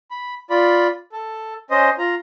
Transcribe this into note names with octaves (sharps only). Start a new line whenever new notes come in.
B5
F4 D5 B5
A4
C#4 C5 D#5
F4 A#5